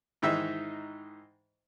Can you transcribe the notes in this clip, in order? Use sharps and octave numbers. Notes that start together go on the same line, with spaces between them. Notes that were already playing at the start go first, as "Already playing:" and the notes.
G#2 D#3 E3 D#4 E5